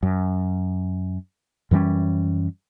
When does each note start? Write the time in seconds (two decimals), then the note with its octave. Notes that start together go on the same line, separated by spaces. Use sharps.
0.03 F#2
1.71 F#2 E3 G3 C#4